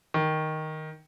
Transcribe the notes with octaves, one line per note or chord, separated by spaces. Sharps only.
D#3